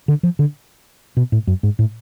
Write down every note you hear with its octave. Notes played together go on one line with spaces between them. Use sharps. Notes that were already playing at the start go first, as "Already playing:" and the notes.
D3
F3
D3
B2
A2
F#2
G#2
A2